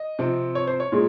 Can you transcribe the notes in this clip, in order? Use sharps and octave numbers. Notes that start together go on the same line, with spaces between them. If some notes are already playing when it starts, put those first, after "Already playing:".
Already playing: D#5
C3 F3 C4
C#5
C5
C#5
A#2 G#3